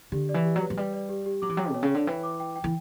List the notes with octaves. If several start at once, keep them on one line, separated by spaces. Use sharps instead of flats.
D3 G4
D5
E3
G4
F#3
B4
F#3
G3 B4
D5
G4
G4
F#3 D6
E3
F#3 G5
B2 C#5
C#3
D3 C#5
E3 G5
D6
G5
G5
E3